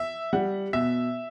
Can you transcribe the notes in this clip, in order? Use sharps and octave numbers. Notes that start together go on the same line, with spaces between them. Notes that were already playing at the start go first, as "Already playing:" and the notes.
Already playing: E5
G3 F#5
B2 E5